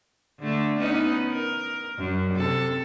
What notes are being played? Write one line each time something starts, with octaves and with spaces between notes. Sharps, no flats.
D3 A3
B3 C#4 D#4
A#4
F#2
C3 A4